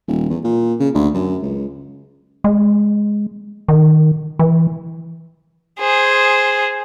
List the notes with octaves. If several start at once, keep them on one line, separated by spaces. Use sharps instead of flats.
D#1
E2
A#2
C#3
D2
F#2
C#2
G#3
D#3
E3
G#4 C5